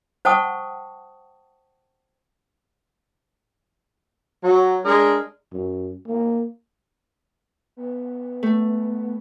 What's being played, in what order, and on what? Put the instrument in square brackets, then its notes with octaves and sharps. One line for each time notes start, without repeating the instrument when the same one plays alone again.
[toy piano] C5 F#5 G5 A5 C#6 D#6
[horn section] F#3
G#3 D4 G#4 A#4
[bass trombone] F#2
A#3
[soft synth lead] B3
[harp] A3